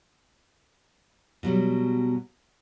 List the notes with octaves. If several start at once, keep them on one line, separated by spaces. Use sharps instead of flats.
B2 F#3 G3